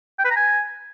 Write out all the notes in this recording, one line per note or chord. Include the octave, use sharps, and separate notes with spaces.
G5
B4
A#5
G#5